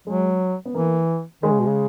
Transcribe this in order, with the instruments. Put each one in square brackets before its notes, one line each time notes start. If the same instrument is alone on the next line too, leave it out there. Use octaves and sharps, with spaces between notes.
[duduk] F#3 [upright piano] G#3
[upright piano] B3
[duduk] E3 [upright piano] A#3
[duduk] D#3 [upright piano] G#3
[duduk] C#3
B2
C#3